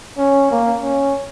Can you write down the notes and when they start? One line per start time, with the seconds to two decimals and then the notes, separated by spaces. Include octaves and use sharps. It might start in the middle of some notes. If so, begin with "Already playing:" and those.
0.18 C#4
0.51 A#3
0.81 C#4